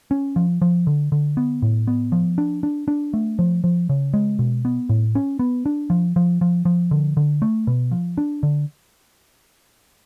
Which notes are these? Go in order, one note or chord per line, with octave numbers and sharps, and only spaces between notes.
C#4
F3
F3
D3
D3
B3
A2
B3
F3
D4
D4
D4
A3
F3
F3
C#3
G#3
B2
B3
A2
C#4
B3
D4
F3
F3
F3
F3
D3
D3
A3
B2
F3
D4
D3